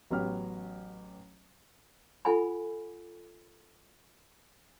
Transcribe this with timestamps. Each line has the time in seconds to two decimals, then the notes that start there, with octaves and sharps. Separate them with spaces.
0.11 A1 F#3 B3 C#4 G4 F6
2.25 F4 A4 F#5 G#5 B5